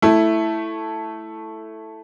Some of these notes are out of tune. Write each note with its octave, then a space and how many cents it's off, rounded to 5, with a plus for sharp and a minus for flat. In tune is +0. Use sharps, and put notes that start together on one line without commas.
A3 +0 E4 +0